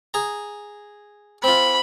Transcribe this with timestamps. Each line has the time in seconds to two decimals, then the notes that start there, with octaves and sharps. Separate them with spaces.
0.14 G#4 A#5
1.44 C4 F4 B5